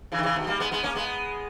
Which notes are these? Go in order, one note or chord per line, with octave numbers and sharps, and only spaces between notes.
C#3 E3
D#3
C#3 E3
B2 D#3
G3 A#3
G#3 B3
G#3 B3
A#3 C#4
G#3 B3